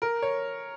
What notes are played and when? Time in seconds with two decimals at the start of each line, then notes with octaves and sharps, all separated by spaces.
0.02 A#4
0.22 C#5